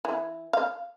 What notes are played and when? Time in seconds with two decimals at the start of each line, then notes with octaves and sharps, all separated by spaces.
0.05 E3
0.53 F5